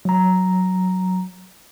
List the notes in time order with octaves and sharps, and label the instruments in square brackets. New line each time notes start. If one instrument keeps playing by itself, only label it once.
[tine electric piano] F#3 A#5